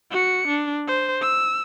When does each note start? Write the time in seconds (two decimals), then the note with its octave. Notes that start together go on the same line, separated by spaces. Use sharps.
0.11 F#4 C#7
0.48 D4
0.88 C5
1.21 E6